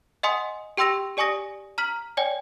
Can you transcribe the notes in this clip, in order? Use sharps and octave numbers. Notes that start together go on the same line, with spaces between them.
D#5 F#5 G#5 C6 D#6
G4 G5 C6 E6 A#6 F7
G4 D5 G#5 C#6 D#6 A#6
A#5 F6 B6 F#7
C#5 D5 G5 G#5